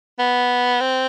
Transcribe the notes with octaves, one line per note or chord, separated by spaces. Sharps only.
B3
C4